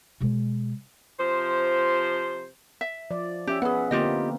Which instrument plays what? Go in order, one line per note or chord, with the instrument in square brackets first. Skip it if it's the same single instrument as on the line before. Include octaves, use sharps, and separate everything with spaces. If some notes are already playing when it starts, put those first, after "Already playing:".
[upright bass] B2 G#3
[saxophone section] C3 F3 C5
[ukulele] E5
[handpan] F3 D5
[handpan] C#4 E5 [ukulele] G4
[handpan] B3 B4 [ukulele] G#4 F#5
[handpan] D3 A#3 C4 [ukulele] F4 G4 D#5